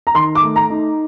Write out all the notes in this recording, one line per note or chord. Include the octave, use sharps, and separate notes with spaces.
A#5
D#3 C6
D6
A3
A#5
D#4